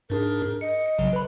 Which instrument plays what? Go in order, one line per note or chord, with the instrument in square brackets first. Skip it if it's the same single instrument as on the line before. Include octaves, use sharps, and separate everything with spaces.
[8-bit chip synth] G#2 D4 G#4 [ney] A#4
[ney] D#5 [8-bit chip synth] C#7
[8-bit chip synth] A1 C#3 F#3
B4 B5